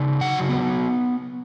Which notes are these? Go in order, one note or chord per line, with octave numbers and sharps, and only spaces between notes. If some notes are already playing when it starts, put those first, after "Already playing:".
Already playing: C#3 D#4
F#3 F#5
B3